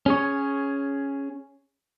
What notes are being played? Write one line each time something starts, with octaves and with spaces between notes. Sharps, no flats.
C#4 G#4 C#5